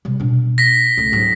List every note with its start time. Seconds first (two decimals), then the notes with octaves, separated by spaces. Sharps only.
0.05 C3 G3
0.20 B2 D4
0.58 A#6 B6
0.97 C#2 A3
1.12 G#2 F#3